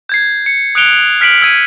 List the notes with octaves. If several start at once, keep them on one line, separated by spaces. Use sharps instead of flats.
G6 G#6 C7
C#7
D#6 F#6 C#7 D7 F7 G7
F6 B6 C7 D7 F#7
E6 G#6 D#7